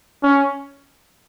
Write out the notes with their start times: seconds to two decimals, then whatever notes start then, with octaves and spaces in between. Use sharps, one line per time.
0.23 C#4